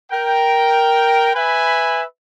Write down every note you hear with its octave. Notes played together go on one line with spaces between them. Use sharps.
A#4 G5
B4 E5 G#5 B5